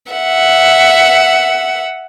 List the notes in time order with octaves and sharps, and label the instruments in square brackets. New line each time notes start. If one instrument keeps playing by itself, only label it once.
[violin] E5 F#5